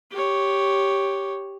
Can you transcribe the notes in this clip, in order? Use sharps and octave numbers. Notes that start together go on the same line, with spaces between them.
G4 C#5